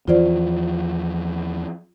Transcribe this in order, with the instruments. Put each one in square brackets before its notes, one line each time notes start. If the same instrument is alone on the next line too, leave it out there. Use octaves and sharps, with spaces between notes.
[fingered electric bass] E2 E3 F3 [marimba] F4 C5 D5